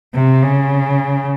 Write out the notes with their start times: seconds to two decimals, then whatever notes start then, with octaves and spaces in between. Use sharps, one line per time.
0.14 C3
0.43 C#3